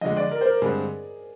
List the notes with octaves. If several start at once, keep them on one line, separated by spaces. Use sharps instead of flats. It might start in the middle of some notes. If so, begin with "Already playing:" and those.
F2 D3 G#3 D#5
D5
A#4
C5
A#4
G2 D3 G#3 C4 G#4